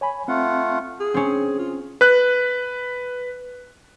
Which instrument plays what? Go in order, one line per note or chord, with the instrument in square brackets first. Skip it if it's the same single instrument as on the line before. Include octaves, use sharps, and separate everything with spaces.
[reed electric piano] C#5 G#5 B5
[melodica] A3 F4 F#5 [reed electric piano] C4
[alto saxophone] G#4
[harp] C4 C#4
[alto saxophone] F4
[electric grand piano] B4 F#6